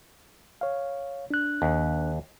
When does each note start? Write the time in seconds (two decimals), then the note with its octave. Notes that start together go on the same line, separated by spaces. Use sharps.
0.61 C#5 F5
1.31 D4 F#6
1.62 D#2